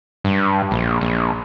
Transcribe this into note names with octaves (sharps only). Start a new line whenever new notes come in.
G2
A#1
A#1